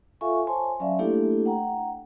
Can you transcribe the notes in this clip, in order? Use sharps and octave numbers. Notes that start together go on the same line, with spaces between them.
F4 A4 E5 F5 G#5 C#6
C5 C#5 G#5 A5 C6
F#3 C#4 D5 E5 F5
A3 A#3 D4 E4 G4 A4
F#5 G5 A#5